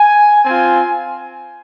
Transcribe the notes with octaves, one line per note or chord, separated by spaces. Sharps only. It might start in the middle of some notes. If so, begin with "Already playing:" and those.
Already playing: G#5
C4 F4 G#5